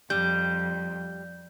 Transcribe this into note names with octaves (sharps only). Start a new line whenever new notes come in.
F2 G3 G6